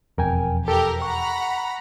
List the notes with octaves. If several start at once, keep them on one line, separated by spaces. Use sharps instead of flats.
E1 F2 A#4 G5 G#5
G4 A4 A#4 E6
F#5 A#5 B5 C#6